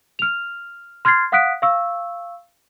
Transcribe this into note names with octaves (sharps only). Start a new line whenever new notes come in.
F6 F7
C6 F6 G#6 A6 C7
F5 F#5 D#6 F#6 B6 D7
F5 C#6 E6